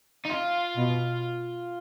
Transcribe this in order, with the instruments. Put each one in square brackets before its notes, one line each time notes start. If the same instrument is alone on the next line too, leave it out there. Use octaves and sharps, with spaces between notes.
[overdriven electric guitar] D#4
F4
[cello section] B2